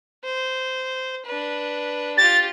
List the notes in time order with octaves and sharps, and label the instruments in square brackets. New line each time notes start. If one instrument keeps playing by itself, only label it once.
[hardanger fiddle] C5
D4 B4
[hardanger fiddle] F4 G4 [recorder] A6